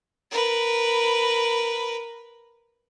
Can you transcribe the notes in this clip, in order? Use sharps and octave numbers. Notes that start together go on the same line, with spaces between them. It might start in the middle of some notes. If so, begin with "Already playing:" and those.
A#4 B4